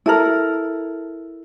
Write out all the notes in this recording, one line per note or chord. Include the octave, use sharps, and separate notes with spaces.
E4 A4 A#4